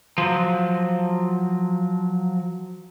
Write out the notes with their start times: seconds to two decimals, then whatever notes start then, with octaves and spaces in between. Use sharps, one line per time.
0.18 F3 F#3